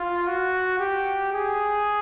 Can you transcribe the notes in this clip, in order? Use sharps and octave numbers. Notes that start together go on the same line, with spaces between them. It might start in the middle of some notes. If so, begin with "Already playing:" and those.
Already playing: F4
F#4
G4
G#4